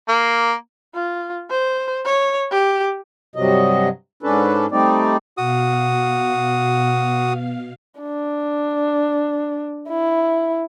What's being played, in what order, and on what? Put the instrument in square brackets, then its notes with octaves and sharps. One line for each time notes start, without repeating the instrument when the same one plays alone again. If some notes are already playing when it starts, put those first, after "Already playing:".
[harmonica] A#3
[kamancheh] F4
C5
C#5
G4
[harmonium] G2 C3 F#3 D#5
G#2 C#4 D4 A4 B4
G3 A3 C4 D#4 D5
[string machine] B2 F5 [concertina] F#4 D#6
[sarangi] D4
E4